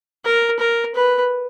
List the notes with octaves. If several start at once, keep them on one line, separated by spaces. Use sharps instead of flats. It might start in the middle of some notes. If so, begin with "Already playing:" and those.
A#4
A#4
B4